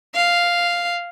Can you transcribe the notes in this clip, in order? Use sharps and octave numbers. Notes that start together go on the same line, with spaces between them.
F5